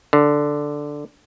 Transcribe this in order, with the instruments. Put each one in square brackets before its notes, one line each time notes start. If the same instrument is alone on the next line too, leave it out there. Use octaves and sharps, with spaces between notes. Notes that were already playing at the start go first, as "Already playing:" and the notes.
[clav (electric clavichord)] D3